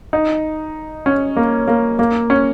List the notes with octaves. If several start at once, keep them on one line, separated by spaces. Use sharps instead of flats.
D#4
C#4
A#3
A#3
A#3
C#4